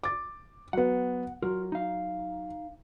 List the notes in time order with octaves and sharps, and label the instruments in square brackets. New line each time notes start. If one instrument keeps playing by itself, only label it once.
[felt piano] D6 A6
[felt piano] F#3 B3 [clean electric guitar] F#5
[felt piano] F#3 [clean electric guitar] F4 A#4
[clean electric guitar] D#4 F5